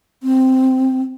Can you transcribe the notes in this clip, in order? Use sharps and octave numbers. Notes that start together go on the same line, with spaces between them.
C4